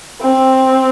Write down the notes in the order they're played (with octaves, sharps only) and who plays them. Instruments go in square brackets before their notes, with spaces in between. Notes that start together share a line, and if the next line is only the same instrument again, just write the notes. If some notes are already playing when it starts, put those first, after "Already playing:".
[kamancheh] C4